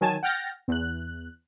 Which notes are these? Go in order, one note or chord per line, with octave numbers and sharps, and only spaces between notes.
D#3 F#3 G#5 A5 E7
F#5 G5 F6 G6 A6 A#6
E2 F#6